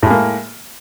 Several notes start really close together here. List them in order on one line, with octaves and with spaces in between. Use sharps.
A2 G#3 A#3